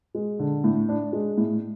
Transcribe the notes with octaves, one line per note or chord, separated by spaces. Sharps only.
G#3
D3
A2
D4
G#3
A2